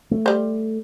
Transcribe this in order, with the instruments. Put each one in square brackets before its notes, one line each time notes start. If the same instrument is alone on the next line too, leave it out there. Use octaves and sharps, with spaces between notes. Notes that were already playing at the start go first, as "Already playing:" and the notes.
[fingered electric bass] A3
[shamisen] G3 C5